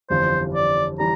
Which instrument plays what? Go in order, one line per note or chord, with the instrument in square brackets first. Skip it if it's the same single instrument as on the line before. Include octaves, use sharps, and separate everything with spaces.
[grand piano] G1 F2 E3 G3 [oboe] C5
[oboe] D5
[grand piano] E3 G3 [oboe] A#5